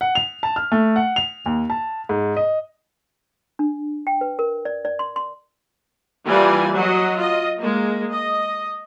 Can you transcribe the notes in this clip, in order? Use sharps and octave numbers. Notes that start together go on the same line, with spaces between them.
F#5
F7
A5
F6
A3
F#5
F7
D#2
A5
G#2
D#5
D4
G5
B4
A#4
D5
D5
C6
C6
E3 G3 A#3 F4 D5 G#5
F#3 F#4 D#5
F4 D#5
G#3 A#3
D#5